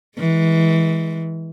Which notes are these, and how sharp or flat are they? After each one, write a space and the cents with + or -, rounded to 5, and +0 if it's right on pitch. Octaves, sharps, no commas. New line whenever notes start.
E3 -20 G#3 +0